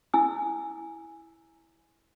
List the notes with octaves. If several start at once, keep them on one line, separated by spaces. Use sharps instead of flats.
E4 G#5 E6